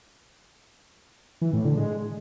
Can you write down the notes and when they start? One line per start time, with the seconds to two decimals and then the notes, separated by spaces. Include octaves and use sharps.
1.41 E3
1.53 A2
1.65 D3
1.77 G#3